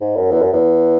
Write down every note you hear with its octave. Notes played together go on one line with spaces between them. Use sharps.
G#2
F#2
E2
F#2
E2